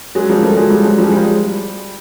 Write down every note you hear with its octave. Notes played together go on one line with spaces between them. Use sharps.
F#3 G#3
F3 G3
G3 A3
F#3 G#3
F3 G3
F#3 G#3
F3 G3
G#3
F3 G3